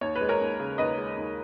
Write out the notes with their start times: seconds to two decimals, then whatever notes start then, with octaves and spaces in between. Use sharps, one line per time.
0.01 D#2 C#5
0.16 B4
0.21 G#3
0.29 A#4 C#5
0.41 D#2
0.59 C#3
0.78 D#2 B4 D#5
0.98 G#3
1.17 D#2